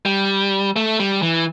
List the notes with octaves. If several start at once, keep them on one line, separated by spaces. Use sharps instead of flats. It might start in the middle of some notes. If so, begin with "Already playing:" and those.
G3
A3
G3
E3